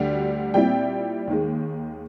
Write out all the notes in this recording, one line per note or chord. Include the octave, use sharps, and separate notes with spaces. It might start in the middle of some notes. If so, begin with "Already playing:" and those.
Already playing: D2 D3 G3
A#2 G3 C4 E4 G5
D#2 D#3 G#3